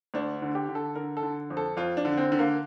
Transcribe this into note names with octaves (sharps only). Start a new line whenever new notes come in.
D2 D4
D3
G4
D3
A4
D3 A#4
A4
D3
F2
A4
F2 F4
D4
D3
C4
D3
A#3